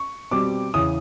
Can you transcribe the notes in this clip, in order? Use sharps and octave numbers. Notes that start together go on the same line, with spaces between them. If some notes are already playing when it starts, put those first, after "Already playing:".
Already playing: C#6
B2 G3 C4 D6
E2 C#3 E3 D#6